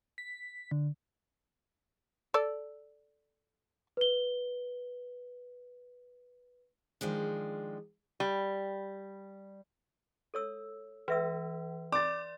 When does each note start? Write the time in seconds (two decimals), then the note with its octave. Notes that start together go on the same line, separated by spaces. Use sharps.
0.18 B6
0.71 D3
2.34 A4 D5
3.97 B4 G7
7.01 D#3 F3 G#3 D4
8.20 G3
10.34 A4 C#5 E6
11.08 E3 B4 E5 E6
11.92 D5 C6 D6 A6